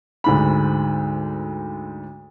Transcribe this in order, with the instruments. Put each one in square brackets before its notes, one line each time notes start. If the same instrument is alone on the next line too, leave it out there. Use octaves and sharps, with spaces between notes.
[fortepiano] D2 G#2 B5